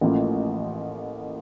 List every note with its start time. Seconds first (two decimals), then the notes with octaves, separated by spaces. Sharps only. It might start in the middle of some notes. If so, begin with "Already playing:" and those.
0.01 A1 A2 F3 A#3 C#4